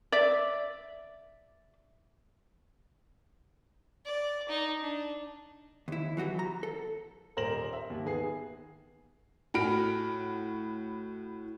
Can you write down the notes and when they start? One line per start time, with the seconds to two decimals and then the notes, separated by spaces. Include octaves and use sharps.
0.12 D5 E5
4.05 D5
4.48 D#4
4.81 D4
5.88 D#2 E4
6.17 E3 F#3 F#4 G4
6.39 A#5
6.63 A4
7.37 D#1 A#4 C5 A#6 E7 F#7
7.73 E5
7.90 D#2
8.05 D#3 B3 G#4 C7
9.54 A2 F#4 B5 F6 D7